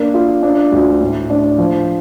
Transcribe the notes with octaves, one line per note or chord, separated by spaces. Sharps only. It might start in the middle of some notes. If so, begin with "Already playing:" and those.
Already playing: A#3 D4
F4
D4
D2
A2
D4
F3